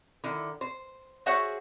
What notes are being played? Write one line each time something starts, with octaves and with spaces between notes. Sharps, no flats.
D3 D#3 E4
C5
F#4 G#4 C5 C#5 E5 F#5